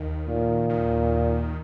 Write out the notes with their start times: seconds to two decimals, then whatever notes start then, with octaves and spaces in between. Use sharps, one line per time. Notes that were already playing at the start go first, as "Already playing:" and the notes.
Already playing: D#2 D#3
0.28 A#2
0.69 D#2 D#3